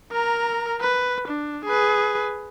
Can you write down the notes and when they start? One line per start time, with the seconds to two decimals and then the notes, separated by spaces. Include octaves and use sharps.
0.12 A#4 A#5
0.81 B4
1.28 D4
1.65 G#4 B4